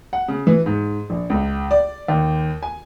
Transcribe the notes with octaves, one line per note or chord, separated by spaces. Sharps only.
F#5
C#3
E3
G#2
A#1
C#2
D5
D#2
G#5